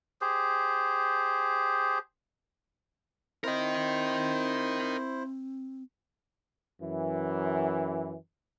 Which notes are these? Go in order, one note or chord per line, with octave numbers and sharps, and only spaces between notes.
G4 G#4 C5
C4 E4 A#4 C5 D#5
F#2 E3